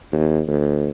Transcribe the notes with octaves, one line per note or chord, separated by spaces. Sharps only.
D#2
D2